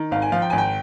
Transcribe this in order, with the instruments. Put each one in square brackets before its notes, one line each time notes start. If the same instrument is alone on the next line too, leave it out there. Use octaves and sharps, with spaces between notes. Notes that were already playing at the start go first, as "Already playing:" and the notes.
Already playing: [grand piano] D#3
G#1 F5
G#5
F3 F5
G5
G#1 G#5
G5